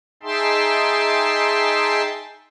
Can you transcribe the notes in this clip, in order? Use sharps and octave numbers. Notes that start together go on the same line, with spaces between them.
D#4 G#4 E5 G5 A5 C6